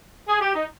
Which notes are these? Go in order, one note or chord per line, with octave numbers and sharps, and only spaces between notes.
G#4
G4
D#4